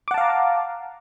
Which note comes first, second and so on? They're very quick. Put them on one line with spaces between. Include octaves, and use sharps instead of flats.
D6 F#5 A5 F5 A#5